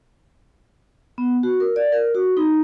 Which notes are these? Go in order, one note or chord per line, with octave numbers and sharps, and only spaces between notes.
B3
F#4
A#4
D5
A#4
F#4
D#4